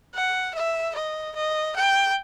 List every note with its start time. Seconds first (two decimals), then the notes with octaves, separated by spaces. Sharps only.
0.14 F#5
0.55 E5
0.95 D#5
1.36 D#5
1.76 G5